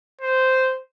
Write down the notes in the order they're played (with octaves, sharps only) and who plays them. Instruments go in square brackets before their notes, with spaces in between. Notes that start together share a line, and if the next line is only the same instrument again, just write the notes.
[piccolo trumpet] C5